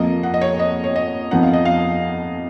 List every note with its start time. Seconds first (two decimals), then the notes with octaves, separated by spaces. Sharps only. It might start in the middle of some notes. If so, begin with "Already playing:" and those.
Already playing: F2 F3 A#3 D#5
0.23 F#5
0.34 D#5
0.41 C#5
0.59 D#5
0.84 C#5
0.96 D#5
1.31 F2 F3 B3 D#4 F#5
1.43 F5
1.53 D#5
1.65 F5